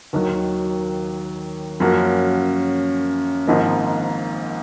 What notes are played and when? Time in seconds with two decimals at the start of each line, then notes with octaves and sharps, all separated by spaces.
0.13 D#2 D#3 F#3
1.80 F#2 F3 A#3 C#4 F#4
3.47 G#1 G#2 F3 A#3 D#4